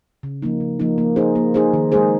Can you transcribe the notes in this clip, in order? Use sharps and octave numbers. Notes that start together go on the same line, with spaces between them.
C#3
F3 A#3 D#4
C#3
F3 A#3 D#4
A#3
D#4 G#4 C5
A#3
D#4 G#4 C5
D#3
G#3 D#4 G#4 C5